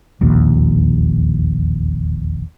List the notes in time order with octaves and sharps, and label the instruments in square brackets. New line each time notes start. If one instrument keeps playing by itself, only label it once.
[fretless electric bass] E1 A#1 D#2